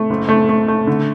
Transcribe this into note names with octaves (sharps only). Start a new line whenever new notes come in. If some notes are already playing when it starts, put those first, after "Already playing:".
Already playing: A3
F#1
A3
A3
A3
D3